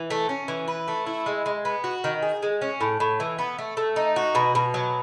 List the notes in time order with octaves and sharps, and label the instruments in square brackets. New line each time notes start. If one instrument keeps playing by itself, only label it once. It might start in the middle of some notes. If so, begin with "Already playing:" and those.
Already playing: [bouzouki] E3
A3
C#4
E3
B4
A3
E4
G#3
G#3
B3
F#4
D#3
G#4
G#3
C#4
A2
A2
E3
B3
A3
A3
D#4
F#4
B2
B2
F#3